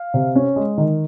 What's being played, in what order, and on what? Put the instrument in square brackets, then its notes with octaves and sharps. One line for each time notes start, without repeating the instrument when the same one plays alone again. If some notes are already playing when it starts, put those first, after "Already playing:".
Already playing: [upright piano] F5
C3
C#4
G#3
D#3